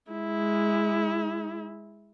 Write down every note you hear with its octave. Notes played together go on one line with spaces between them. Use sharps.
G#3 E4